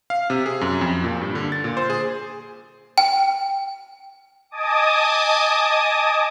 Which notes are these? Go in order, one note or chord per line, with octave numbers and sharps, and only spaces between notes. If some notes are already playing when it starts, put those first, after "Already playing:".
F5
C3
G#4
F#2
F2
A#2
G2
D3
A6
A#2
C5
G#4
G5
D#5 G#5 A5 D6 D#6